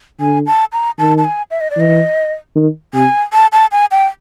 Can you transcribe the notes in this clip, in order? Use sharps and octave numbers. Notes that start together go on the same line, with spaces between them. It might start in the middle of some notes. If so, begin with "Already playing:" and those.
D3 G#5
A5
A#5
D#3 A5
A5
G#5
E5
D#5
D5
E3 D#5
D#3
C3 G#5
A5
A5
G#5
G5